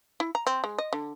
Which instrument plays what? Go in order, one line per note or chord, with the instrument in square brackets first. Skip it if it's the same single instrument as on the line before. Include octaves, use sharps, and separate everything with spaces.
[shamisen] E4
A#5
C4
G#3
D#5
D3